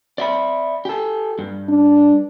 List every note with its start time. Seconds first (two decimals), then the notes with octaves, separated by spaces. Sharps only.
0.18 D5 E5 B5
0.85 G4 A4
1.39 G2
1.69 D4